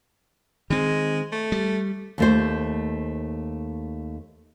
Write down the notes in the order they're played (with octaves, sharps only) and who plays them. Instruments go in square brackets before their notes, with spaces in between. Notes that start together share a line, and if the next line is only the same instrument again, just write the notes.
[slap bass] D#3 C4 [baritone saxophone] G#3
[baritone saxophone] A3
[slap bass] G3
[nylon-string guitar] D#2 A3 C5